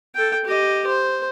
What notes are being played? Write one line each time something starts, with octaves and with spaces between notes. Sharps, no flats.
A4 G5
G4 D#5
C5